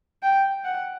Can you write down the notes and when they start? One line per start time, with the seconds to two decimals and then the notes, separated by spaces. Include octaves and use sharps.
0.23 G5
0.65 F#5